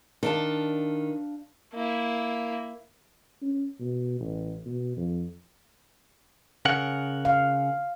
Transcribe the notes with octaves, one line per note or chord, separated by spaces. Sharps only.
D#3 D4 F5 A5
A#3 E4
C#4
B2
A1
B2
F2
C#3 A#4 F#5
F5